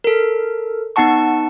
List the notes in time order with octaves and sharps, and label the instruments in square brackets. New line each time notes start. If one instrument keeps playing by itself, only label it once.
[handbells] A4 A#4
B3 D#4 F#5 A5 C#6